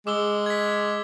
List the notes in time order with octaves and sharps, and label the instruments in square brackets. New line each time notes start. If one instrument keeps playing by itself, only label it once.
[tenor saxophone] G#3 [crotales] D6 E6 G7
[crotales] G#6 B6